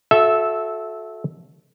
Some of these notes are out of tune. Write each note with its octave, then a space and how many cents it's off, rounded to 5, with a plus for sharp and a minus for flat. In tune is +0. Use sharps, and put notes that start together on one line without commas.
F#4 -35 A4 -15 E5 +0